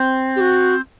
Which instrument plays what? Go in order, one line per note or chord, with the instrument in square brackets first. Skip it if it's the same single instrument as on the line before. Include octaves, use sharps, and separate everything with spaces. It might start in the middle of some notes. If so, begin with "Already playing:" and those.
Already playing: [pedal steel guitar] C4
[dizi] G4
F#4